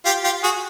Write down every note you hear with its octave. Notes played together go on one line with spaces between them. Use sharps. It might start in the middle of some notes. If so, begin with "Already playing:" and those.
F4 G4
F4 G4
F#4 G#4